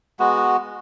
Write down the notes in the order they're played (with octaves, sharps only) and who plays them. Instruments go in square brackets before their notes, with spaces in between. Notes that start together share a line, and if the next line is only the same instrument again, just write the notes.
[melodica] G#3 B3 F#4